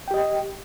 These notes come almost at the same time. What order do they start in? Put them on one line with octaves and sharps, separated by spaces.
G5 G4 D#5